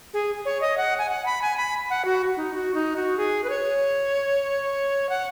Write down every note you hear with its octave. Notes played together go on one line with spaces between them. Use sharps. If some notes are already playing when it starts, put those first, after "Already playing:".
G#4
C#5
D#5
F#5
G#5
F#5
B5
G#5
B5
F#5
F#4
D#4
F#4
D#4
F#4
G#4
B4
C#5
F#5